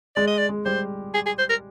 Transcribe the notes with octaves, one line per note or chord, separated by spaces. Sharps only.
G#3 D5
D#5
D5
G#3
G3 G4 C5
G#4
G#4
C5
A#4